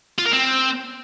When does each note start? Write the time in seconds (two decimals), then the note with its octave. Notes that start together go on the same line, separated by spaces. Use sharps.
0.19 F4
0.26 A#4
0.33 C4